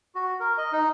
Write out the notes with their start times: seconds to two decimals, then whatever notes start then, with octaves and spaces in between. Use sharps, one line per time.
0.15 F#4
0.40 A#4
0.58 D#5
0.72 D#4